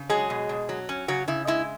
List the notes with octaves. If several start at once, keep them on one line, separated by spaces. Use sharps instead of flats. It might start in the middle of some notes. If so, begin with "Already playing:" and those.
Already playing: C#3
F#3 G#3 G#4
B2
B2
F#3
C#4
C#3 F#3 F#4
C#3 E4
G#3 E4